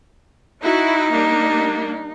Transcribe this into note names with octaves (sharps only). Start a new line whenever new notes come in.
D#4 E4 F#4
G3 A#3 D4